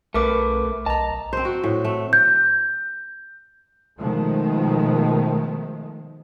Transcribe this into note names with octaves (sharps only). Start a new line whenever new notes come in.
B1 A3 A#4 B4 D6
B1 D#5 A5 A#5
C4 C5
F#4
A2
A3
G6
B2 D#3 F3 G#3 A3